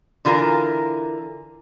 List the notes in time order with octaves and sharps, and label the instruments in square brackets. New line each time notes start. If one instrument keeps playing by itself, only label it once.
[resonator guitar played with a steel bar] D3 E3 F4 A#4 A#5